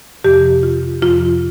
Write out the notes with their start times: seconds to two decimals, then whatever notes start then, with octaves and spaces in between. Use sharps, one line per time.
0.24 F2 C3 F3 G4
0.63 F4
1.02 F2 C3 F3 F4